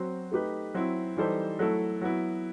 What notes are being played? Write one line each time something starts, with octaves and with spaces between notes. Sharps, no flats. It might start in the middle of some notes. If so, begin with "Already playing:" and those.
Already playing: F#3 C4 F#4 C5
A3 D#4 G4 B4
F#3 C4 E4
E3 G3 D#4 A4 C5
F#3 A3 E4 A4
F#3 B3 E4